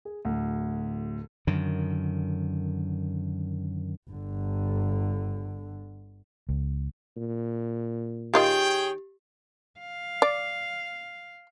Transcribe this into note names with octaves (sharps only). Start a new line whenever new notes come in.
G#4
D1 D2
F#2 D3 D#3
G1 D3
C#2
A#2
D#3 F4 G4 G#4 C#5 D#5 G5
F5
D5